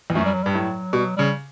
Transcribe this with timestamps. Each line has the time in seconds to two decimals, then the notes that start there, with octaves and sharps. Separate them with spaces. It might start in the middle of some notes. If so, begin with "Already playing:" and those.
0.10 E2
0.15 F#2 A3
0.25 G3
0.34 F#3
0.43 G2 G3
0.54 A2 F#3
0.93 B2 G3
1.05 F#3
1.16 C#3 G3